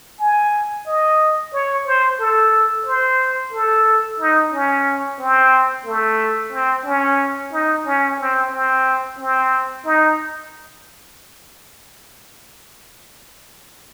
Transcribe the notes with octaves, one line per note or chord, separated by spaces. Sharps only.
G#5
D#5
C#5
C5
A4
C5
A4
D#4
C#4
C4
A3
C4
C#4
D#4
C#4
C4
C4
C4
D#4